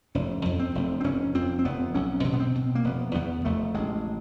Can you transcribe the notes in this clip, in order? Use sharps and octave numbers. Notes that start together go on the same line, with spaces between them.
F1 C#4
F2
C4
F1
C4
F1 C#4
F2 C4
C4
F1 B3
B1 C#4
B2
B3
C4
B2
A#3
F1 B3
E2 B3
F1 A3
A1 G#3